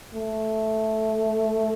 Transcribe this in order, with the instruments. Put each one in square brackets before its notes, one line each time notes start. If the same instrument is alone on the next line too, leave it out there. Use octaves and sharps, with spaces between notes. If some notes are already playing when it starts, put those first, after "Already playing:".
[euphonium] A3